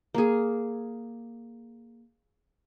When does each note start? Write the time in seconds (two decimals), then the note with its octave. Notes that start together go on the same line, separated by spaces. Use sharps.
0.15 A#3 G#4